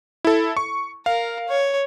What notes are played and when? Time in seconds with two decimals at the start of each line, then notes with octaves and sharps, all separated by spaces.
0.25 E4 A4
0.57 C#6
1.06 A#4 F5
1.49 C#5